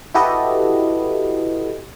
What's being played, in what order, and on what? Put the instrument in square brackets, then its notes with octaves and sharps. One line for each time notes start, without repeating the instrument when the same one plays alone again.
[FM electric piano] E4 F#4 G4 A4 B4 D#5